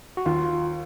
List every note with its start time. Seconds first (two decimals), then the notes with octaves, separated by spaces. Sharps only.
0.17 F#4
0.26 D#2 F4